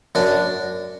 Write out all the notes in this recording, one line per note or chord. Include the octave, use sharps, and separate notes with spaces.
F#2 D4